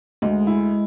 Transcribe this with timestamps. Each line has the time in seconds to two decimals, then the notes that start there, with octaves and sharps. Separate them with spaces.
0.22 D2 G#3
0.47 E4